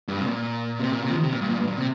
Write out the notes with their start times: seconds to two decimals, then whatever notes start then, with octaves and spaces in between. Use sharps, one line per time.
0.08 G2
0.20 C3
0.26 A#2
0.79 C3
0.91 A#2
1.03 C3
1.10 F3
1.14 D#3
1.23 C3
1.33 A#2
1.41 G2
1.50 A#2
1.59 G2
1.67 A#2
1.77 C3